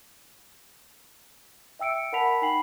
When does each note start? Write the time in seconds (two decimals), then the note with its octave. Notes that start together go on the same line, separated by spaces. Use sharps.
1.79 E5 G5 E6 C#7 D7
2.13 A#4 F#5 A5 B5 B6 F7
2.42 D#4 G5 G#5 B5 C7 F#7